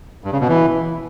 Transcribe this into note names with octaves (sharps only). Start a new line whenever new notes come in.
G2
C#3
B2
E3